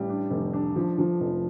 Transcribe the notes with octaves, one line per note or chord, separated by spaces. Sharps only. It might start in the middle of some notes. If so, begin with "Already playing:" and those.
Already playing: A1 G3
D4
F1
D4
F3
F3
F1